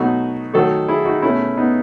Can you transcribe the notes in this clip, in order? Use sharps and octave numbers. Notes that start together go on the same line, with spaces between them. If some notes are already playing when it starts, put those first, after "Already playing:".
Already playing: B2 F#3 A3 D#4 F#4
D#3 F#3 A3 F#4 A4
E4 G#4
D#4 F#4
B2 A3 C#4 E4
B3 D#4